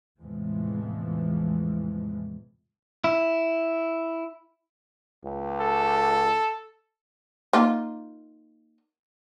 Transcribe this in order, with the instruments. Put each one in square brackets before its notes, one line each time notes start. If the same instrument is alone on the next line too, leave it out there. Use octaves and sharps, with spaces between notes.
[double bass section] E2 A2 C3 E3 F3 G#3
[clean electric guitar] E4
[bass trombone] C#2
[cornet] A4
[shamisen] A#3 D#4 F4